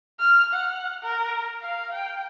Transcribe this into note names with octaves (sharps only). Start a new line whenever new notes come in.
F6
F#5
A#4
F5
G5